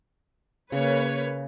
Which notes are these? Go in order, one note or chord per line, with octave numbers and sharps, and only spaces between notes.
C#3 A#3 B4 C#5